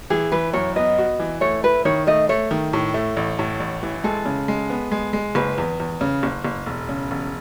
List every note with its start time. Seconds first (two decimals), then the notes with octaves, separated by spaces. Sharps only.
0.10 E3 G#4
0.32 E3 B4
0.53 F#2 C#5
0.76 B3 D#5
0.98 F#4
1.19 E3
1.41 A3 C#5
1.63 E4 B4
1.85 D#3 C#5
2.07 A3 D#5
2.29 A3 C#5
2.51 D#3
2.73 A2
2.94 A3
3.17 A1
3.39 A2
3.60 A1
3.83 E3
4.04 G#3 A4
4.26 C#3
4.48 G#3
4.70 B3
4.92 G#3
5.13 G#3
5.35 F#1 B4
5.58 E2
5.80 E2
6.01 C#3
6.23 F#1
6.45 F#1
6.66 E1
6.89 C#3
7.11 E1